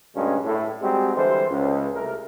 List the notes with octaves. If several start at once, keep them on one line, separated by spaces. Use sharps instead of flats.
D2 G2 A#2 F#3 G#3 C#4
A2
G3 G#3 C4 D#4 F#4 G4
D3 E3 G3 G#3 C5
C#2
C2 A3 A#4